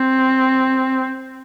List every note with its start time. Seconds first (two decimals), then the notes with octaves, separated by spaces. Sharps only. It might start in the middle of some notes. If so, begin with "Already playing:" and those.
Already playing: C4